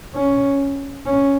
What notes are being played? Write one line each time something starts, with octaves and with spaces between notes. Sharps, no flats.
C#4
C#4